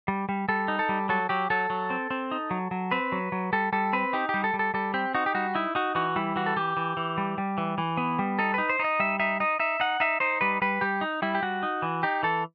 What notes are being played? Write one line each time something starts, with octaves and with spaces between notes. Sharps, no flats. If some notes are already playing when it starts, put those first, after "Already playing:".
G3
G3
G3 A4
D#4
A4
G3
F#3 A4
F#3 G4
F#3 A4
F#3
C4
C4
D#4
F#3
F#3
C4 B4
F#3
F#3
G3 A4
G3 A4
C4 B4
D#4 G4
G3 G4
A4
G3
A4
G3 A4
C4 G4
D#4 F#4
G4
G3 F#4
D#4 E4
D#4 F#4
E3 F#4
G3 E4
E3 F#4
A4
E3 G4
E3
E3
G3
G3
E3
E3
B3
G3
D#4 A4
D#4 B4
C5
D#4 D#5
G3 E5
D#4 E5
D#4 D#5
D#4 E5
D#4 F#5
D#4 E5
D#4 C5
G3 B4
G3 B4
G3 G4
D#4
G3 E4
G4
G3 F#4
D#4
E3
D#4 G4
E3 A4